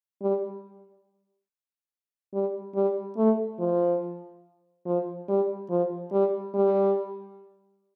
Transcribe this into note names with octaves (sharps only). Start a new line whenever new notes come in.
G3
G3
G3
A3
F3
F3
G3
F3
G3
G3